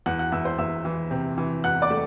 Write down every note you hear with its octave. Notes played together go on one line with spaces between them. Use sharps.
E2 F#5 F#6
F#5 F#6
E2 E5 E6
C5 C6
E2 E5 E6
E3
C3
E3
E2 F#5 F#6
D5 D6
A3